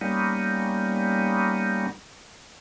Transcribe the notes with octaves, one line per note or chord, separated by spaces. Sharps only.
G3 A#3 B3 C#4 D#4